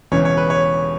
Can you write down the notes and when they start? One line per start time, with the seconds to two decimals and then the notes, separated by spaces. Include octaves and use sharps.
0.12 E1 E2 C#3 E3 C#5
0.25 C#5
0.37 B4
0.50 C#5